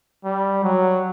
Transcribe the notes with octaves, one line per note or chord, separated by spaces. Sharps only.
G3
F#3